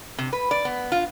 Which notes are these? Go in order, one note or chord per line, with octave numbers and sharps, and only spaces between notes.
C3
B4
D5
B3
F4